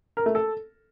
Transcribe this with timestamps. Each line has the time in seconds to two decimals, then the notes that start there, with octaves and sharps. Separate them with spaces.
0.17 A#4
0.26 A3
0.35 A4